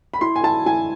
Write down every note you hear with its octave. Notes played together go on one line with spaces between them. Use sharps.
B5
E4 C6
G#5
E4 A5
E4 G#5